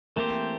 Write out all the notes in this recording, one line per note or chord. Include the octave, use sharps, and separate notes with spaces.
E3 A3 A#3 C4 G4 C5